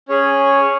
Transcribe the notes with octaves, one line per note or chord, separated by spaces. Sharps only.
C#4 G#4 C#5